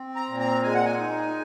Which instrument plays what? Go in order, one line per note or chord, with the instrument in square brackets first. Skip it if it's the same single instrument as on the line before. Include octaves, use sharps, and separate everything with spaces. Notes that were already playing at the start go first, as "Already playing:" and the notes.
Already playing: [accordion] C4
A#5
A#2
A#5
G#3 G#5
F#5
G#5
D#4